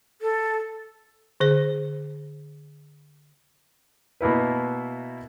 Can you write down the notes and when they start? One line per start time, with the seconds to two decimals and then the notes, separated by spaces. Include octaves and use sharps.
0.22 A4
1.40 D3 G#4 C5
4.21 B2 A#3 E4 B4